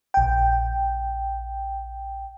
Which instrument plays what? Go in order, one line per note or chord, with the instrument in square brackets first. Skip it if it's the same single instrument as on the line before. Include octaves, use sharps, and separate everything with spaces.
[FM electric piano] A#1 G5